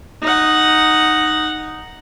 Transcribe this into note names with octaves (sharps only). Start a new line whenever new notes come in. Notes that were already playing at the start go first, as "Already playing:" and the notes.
D#4 F#5